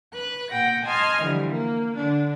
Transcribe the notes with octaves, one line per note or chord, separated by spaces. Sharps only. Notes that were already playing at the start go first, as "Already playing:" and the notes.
B4 F#6
A#2 F#5 G5 A#6
D#5 G#5 A5 C6 D#6 F6
D3 E3 F3 G3
A#3
D3 D4